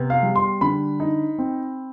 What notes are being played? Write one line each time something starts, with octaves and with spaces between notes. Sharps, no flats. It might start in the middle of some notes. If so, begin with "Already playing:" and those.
Already playing: C3 B3
F5
G3
C6
D3 B5
D#4
C4